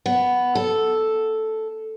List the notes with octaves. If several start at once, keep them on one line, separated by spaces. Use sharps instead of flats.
B3
A4